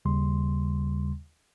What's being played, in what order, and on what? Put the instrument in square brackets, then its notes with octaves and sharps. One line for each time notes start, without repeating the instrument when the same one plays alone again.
[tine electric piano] D#2 C#3 G3 C6